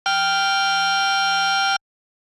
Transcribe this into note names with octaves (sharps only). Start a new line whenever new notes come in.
G5 F6